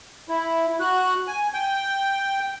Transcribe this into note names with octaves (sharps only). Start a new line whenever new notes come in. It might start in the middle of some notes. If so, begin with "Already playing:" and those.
E4
F#4 F#6
G#5
G5